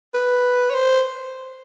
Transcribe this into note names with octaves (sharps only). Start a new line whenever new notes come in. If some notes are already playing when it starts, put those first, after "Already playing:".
B4
C#5
C5